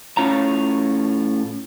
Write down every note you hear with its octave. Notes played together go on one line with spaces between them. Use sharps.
A2 C#4 F4 A#5